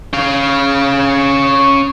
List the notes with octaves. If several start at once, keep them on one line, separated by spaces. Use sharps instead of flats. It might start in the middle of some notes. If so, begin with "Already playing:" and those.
C#4 F5